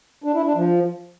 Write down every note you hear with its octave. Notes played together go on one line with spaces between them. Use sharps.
D4
E4
D4
F3